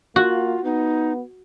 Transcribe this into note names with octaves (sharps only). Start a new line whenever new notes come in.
A#3 F4 F#4
B3 D#4